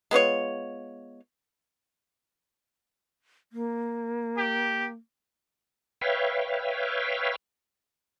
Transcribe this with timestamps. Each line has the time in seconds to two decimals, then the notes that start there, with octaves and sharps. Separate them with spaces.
0.11 G#3 B3 F4 C#5
3.53 A#3
4.38 G4
6.01 B4 C#5 E5 F5 G5